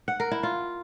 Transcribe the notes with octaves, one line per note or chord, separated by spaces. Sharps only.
F#5
A#4
E4
F4